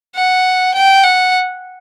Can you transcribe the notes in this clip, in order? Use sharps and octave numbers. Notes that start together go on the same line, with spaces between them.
F#5
G5
F#5